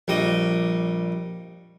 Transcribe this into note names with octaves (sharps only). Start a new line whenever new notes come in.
A#1 G3 D#5